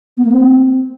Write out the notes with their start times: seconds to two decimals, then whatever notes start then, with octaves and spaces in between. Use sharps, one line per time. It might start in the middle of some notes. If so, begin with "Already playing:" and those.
0.17 B3
0.25 A#3
0.32 C4